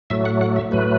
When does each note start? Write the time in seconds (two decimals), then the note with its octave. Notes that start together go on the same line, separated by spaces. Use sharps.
0.10 A2 F#3 A3 E5
0.25 F#5
0.41 F#5
0.56 E5
0.71 A2 F#3 A3 B4